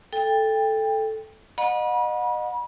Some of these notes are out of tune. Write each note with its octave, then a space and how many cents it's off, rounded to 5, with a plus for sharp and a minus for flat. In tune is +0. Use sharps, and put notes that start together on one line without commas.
A4 -5 G5 +25
D#5 -25 F#5 -35 B5 -35